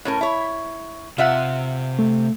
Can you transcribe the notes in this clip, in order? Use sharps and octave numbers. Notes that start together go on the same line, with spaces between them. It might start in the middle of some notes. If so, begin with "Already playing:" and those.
A2 C#4 A#4
E4 C#5
C3 F4 E5 F#5
A3